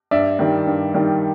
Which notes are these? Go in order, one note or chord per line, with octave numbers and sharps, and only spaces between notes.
G2 D5 E5
D#3 G3
G2
D#3 G3